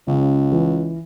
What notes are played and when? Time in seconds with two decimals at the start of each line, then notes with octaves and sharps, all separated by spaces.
0.07 C#2 C#3
0.52 E3